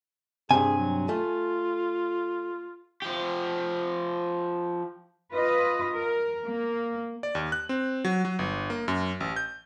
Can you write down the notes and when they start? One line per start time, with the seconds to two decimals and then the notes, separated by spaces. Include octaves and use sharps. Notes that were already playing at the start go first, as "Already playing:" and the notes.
0.51 G2 C3 G#4 G#5
0.77 F#3
1.09 A3 F4
3.02 F3 G4
5.33 F4 B4 D#5
5.96 A#4
6.47 A#3
7.23 D5
7.35 D#2
7.52 F#6
7.69 C4
8.05 F#3
8.25 F#3
8.39 G1
8.70 A#3
8.88 F#2
9.20 A1
9.36 G6